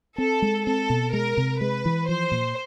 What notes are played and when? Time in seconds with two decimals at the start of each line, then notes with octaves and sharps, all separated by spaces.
0.18 C4 A4
0.42 G#3
0.66 C4 A4
0.90 B2
1.13 G#3 A#4
1.37 C3
1.61 G#3 B4
1.85 E3
2.08 F3 C5
2.32 A#2